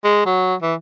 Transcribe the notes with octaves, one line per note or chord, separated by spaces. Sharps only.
G#3
F#3
E3